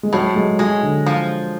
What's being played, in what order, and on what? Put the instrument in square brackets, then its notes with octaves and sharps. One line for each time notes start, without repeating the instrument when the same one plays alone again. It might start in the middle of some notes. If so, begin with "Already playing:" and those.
[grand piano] G#3
[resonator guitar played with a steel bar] A2 [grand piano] F#3
[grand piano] G#3
[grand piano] F#3 [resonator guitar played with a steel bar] G#3
[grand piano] D3
[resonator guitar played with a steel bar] F3